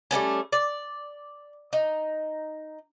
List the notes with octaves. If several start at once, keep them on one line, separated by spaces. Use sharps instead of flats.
G3 A3 B3 C#4
D5
D#4